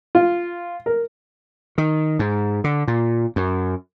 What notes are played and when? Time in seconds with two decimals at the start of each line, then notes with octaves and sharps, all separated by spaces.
0.15 F4
0.86 A#4
1.78 D#3
2.19 G#2
2.64 D3
2.88 A#2
3.36 F#2